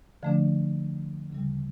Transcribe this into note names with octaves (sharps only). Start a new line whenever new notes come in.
D3 F3 A3 D4
D2 C#3 G3